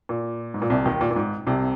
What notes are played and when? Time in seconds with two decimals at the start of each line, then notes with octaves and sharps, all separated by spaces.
0.09 A#2
0.54 G#2
0.62 A#2
0.70 C2 C3
0.85 D#2 D#3
1.01 A#2
1.11 A#2
1.16 G#2
1.47 C2 C3